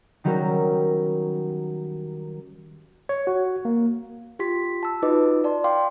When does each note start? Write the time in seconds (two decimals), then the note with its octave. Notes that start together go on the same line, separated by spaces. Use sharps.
0.24 D#3 F#3 G3 C#4 A#4
3.09 C#5
3.27 F#4
3.65 A#3
4.39 F4 G4 C6 B6
4.83 A5 E6
5.02 D#4 F4 F#4 B4 D#5 D6
5.44 D5 A5 C6
5.64 F5 G5 C6 D6